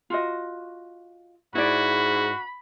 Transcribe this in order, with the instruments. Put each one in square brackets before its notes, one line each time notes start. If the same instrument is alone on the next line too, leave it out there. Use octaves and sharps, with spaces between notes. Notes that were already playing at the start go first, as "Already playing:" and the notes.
[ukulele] F4 F#4 D#5
[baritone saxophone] G#2 [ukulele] E4 D5 [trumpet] F#4 [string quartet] B5